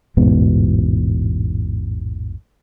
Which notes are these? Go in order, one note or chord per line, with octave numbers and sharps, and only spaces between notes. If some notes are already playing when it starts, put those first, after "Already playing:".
A1 E2 G#2 B2